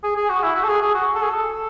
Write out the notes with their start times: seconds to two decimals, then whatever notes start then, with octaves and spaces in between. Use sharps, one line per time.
0.04 G#4
0.17 G#4
0.29 F#4
0.43 E4
0.56 F#4
0.64 A4
0.68 G#4
0.81 G#4
0.95 F#4
1.15 A4
1.22 G#4
1.30 A4